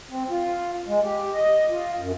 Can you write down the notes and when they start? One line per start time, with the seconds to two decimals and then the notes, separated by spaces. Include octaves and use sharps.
0.11 C4
0.30 F4
0.88 G#3
1.04 G4
1.33 D#5
1.70 F4
1.99 F#2